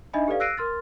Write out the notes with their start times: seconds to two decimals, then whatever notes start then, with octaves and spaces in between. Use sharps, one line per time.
0.13 D4 D#4 D#5 E5 G#5 B5
0.28 G4 A4 B4 D5 F5
0.40 E6 F#6 A#6 C7 D7 D#7
0.57 A#4 C6 F6 A6